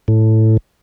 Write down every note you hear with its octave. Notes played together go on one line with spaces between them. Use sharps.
A2